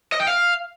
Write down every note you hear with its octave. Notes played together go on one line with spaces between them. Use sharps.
D#5
G5
F5